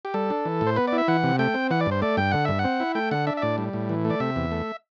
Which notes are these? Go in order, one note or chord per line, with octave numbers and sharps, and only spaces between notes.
G4
G3 A4
D4
E3
A2
C5
B3 B4
D5
E4
E5
E3 F#5
C3
A3 G5
C4
E3 F#5
D5
G2
C5
A3 D5
G2 G5
D3 F#5
G2 E5
F#5
C4
E4
A3 G5
D3 F#5
D4 E5
E5
A2 D5
G3
A2
E3
A3
D5
C3 E5
E2
A3